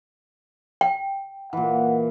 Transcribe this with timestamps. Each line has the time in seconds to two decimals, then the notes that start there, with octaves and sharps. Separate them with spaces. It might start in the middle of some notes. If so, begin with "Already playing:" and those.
0.81 G5
1.53 A#2 E3 F#5